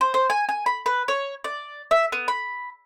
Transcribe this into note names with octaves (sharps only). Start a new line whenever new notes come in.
C5
C5
G#5
G#5
B5
B4
C#5
D5
E5
B3
B5